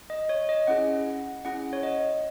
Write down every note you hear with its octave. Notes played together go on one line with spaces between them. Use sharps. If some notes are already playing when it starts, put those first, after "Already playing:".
D#5
C#5
D#5
C#4 E4 G#4 F#5
C#4 E4 G#4 F#5
C#5
D#5